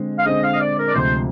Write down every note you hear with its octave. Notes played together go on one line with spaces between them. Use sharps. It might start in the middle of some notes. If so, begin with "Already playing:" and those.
Already playing: D3 G#3 C4
F5
D3 G#3 C4 D#5
F5
D#5
D5
A#4
D5
D2 C3 F3 G#3 C5